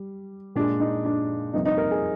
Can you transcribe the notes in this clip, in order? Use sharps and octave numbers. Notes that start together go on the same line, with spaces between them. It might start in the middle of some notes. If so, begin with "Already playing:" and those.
Already playing: G3
A#2 G#3 D4
D#4
D4
F2 C3 G3 A#3 D#4
D#4
A#4
G#4